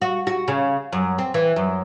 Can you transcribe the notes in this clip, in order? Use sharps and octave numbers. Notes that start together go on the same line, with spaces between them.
F#4
F#4
C#3
F#2
C4
E3
F#2